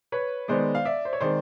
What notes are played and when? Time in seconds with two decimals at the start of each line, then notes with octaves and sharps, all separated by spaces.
0.12 B4 C#5
0.48 D#3 G#3 B3 C5 D5
0.75 F5
0.85 D5 E5
1.05 C5
1.13 C#5
1.21 D#3 G#3 C4 C5 D5